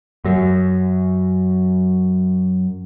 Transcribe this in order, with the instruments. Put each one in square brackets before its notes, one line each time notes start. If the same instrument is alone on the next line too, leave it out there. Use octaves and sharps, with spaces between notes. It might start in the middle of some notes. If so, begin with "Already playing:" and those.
[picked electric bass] F#2 F#3